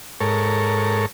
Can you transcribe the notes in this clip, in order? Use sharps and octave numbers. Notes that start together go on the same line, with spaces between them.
G#2 A4 A#4 C#5